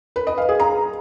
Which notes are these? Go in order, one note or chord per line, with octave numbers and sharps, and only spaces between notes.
B4
D#5
F5
G#4
A#5